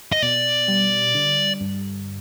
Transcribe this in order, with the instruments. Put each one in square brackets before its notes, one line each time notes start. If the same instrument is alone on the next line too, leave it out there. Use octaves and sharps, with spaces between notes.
[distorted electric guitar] D#5
[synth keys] B2 [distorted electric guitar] D5
[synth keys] G3
D3
G2